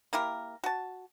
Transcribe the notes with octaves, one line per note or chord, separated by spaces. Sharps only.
A#3 E4 G4 A#4
F#4 A5